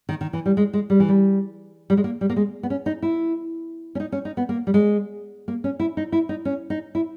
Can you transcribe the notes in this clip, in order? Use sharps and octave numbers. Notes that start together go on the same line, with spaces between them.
D#3
D#3
E3
G3
G#3
G#3
G3
E3
G3
G3
G#3
A#3
G3
A#3
G#3
B3
C#4
D#4
E4
C#4
D#4
C#4
D#4
B3
A#3
G3
G#3
A#3
C#4
E4
D#4
E4
D#4
C#4
D#4
E4